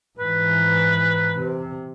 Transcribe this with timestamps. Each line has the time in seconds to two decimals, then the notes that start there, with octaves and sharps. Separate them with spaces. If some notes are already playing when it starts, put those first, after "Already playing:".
0.19 G#2 E3 B4
1.38 C3